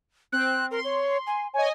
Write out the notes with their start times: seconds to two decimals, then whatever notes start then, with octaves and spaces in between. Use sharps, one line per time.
0.32 C4 F#6
0.71 A#4 C6
0.84 C#5
1.27 G#5
1.54 C#5 D#5 G#5